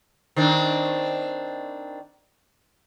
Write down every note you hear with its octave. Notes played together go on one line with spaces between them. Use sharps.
D#3 C4 D4